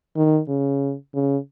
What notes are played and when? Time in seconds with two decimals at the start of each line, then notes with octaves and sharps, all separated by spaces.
0.16 D#3
0.48 C#3
1.14 C#3